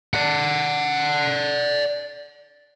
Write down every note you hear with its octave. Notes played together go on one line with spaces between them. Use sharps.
D5 F#5